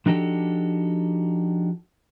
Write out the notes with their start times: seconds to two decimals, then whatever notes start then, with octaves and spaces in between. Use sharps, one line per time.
0.06 F3 D4 D#4 F#4 G4 A4